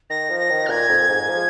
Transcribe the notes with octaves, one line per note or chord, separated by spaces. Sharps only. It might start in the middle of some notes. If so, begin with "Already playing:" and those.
D#3 A#6
F3
A#6
D#3
F6
A#2 G#6
F2
G#2
F3